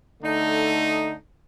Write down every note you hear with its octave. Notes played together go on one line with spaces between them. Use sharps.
D3 A3 D#4 A4